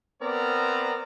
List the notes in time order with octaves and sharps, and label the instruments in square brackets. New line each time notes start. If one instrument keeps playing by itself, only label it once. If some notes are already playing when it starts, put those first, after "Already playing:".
[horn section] B3 C4 A#4 D5 A#5